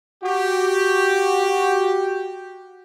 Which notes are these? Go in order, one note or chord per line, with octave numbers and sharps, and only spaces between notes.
F#4 G4